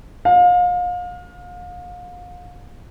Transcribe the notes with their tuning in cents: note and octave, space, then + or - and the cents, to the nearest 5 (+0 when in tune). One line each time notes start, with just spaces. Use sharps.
F5 +35